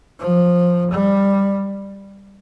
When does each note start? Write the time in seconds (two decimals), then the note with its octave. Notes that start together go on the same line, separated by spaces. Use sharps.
0.20 F3
0.91 G3